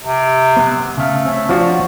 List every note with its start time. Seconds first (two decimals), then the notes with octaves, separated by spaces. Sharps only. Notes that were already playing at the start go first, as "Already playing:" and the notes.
0.03 C3
0.57 B3 F#5
0.97 C#3 A3 F5
1.25 C4 C#4
1.49 F3 D4 F4 F#4 C#5